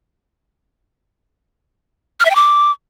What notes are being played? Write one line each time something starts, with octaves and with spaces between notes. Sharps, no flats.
F6
E5
G5
D6